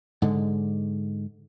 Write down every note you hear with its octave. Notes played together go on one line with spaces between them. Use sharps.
G#2 D3 G#3